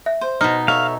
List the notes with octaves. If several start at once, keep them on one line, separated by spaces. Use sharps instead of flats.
E5
C5
B2 D#4 F6
A4 C#5 E5 F5